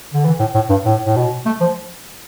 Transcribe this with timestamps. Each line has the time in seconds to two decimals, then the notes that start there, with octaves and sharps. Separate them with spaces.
0.14 D3
0.25 E3
0.39 A2
0.54 A2
0.69 G2
0.85 A2
1.06 A2
1.16 B2
1.46 A3
1.61 F3